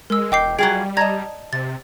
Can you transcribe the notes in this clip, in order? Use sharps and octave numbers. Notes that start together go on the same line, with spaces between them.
G#3 A#4 E6
E1 D#5 G5 D6 C7
F#3 G3 F4 G#4 G5
D5 D#5 A5 A#5 G#6 A#6
C3 A6